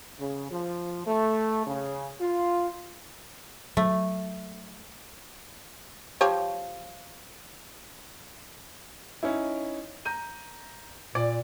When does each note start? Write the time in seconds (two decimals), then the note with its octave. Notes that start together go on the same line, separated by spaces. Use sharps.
0.19 C#3
0.51 F3
1.06 A3
1.67 C#3
2.21 F4
3.77 F#3 A3
6.21 F3 G4 C#5
9.23 C#4 D#4 E4
10.05 A#5 G6 D#7
11.15 A#2 D5